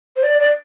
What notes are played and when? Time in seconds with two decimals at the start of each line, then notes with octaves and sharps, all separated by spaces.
0.16 C5
0.23 D5
0.40 D5